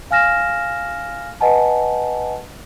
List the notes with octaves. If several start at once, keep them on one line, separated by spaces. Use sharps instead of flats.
F5 G#5 F6 A#6 E7
B4 D#5 F#5 G#5 A5